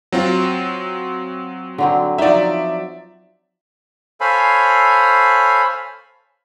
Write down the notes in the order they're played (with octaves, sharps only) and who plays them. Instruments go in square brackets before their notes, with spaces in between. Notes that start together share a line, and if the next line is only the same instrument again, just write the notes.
[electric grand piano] F#3 C4 F4
[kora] D3 F#3 C4
[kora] F3 F#3 D#4 [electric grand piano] D5 E5
[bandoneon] A4 C5 C#5 F5 G#5 B5